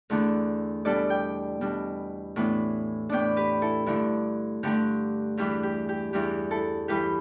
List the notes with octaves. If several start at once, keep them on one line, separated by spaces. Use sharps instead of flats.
E2 D3 A3 D4
B2 G3 D4 A4 D5
D5 G5
B2 G3 D4
A2 E3 B3 D4
A2 E3 B3 D4 D5 G5
G4 B4
E4 A4
G2 D3 A3 D4 E4
G2 D3 A3 D4 G4
E2 E3 G3 D4 G4
G4
G4
E2 E3 G3 D4 G4
E4 A4
G2 E3 G3 G4 B4